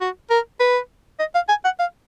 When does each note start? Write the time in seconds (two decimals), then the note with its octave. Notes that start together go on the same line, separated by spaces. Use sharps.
0.01 F#4
0.30 A#4
0.60 B4
1.19 D#5
1.35 F5
1.49 G#5
1.64 F#5
1.79 F5